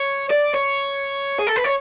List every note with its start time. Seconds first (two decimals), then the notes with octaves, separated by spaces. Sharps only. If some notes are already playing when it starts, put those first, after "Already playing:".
Already playing: C#5
0.31 D5
0.55 C#5
1.39 G#4
1.47 A4
1.56 B4
1.64 C#5